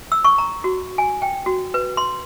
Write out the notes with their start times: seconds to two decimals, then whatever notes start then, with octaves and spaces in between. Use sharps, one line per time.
0.12 E6
0.24 C#6
0.38 A#5
0.64 F#4
0.98 G#5
1.22 G5
1.46 F#4
1.74 B4
1.97 C6